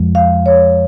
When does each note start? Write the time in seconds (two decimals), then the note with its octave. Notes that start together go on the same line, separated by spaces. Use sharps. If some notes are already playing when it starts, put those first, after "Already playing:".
Already playing: F2 F3 G#3
0.15 F5
0.46 C#5